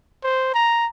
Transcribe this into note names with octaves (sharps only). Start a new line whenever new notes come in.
C5
A#5